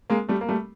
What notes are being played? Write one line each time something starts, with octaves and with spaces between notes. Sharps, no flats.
G#3 A#3
G3 A3
A#3
G3 A3